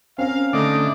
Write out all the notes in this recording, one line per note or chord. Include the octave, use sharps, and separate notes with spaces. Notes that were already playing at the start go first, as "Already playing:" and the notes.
C4 C#4 A#4 F5
D3 A3 D4 D#4 D#5 D6